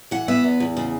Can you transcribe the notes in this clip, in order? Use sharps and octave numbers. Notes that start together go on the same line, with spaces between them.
E3 F#5
B3 E5
E2
E2
C#3